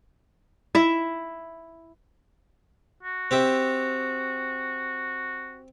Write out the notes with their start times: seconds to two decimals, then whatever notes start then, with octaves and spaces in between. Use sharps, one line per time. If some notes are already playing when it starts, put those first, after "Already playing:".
0.75 E4 E5
3.03 F#4
3.31 C4 G4 E5